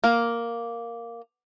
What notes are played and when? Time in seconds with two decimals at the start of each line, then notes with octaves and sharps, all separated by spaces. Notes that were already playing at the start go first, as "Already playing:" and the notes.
0.04 A#3